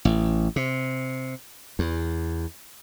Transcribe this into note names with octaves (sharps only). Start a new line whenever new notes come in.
A1
C3
E2